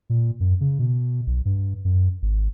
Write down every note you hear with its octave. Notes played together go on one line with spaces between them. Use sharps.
A#2
F#2
C#3
B2
B1
G2
F#2
G#1